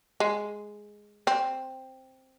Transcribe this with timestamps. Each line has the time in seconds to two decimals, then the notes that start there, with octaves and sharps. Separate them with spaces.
0.20 G#3
1.27 C4